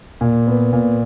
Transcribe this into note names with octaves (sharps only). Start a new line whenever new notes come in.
A#2
B3
A#2